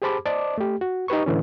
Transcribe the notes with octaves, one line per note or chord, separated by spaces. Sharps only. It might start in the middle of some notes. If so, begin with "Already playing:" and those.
G4 G#4 C5 A5 B5 D6
C5 D5 D#5 A5 D6
A3 G4
F#4
D#4 G4 B4 C#6
A2 D3 E3 C#4